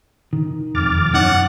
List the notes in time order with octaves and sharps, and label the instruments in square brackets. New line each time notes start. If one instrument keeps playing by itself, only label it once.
[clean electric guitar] D#3
[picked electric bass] E1 F2 [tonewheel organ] D6 F6 A6
[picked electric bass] F#2 [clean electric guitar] D#4 C#5 [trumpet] F#5